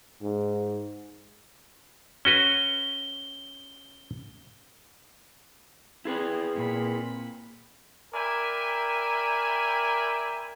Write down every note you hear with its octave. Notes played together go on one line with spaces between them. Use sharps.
G#2
C#4 F#4 B4 G7
C4 E4 G#4 B4
A#2 B5
A#4 D5 E5 G5 G#5 B5